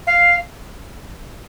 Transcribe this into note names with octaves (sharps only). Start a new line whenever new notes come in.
F5